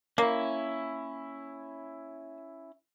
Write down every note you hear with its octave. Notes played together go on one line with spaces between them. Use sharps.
A#3 C#4 E4